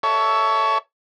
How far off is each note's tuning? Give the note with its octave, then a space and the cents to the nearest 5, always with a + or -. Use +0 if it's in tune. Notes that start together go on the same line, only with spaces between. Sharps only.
A4 +0 C#5 +20 E5 +0